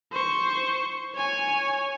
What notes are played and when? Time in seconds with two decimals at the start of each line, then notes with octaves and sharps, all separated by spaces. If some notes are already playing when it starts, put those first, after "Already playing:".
0.12 C5 C#6
1.15 C#5 G#5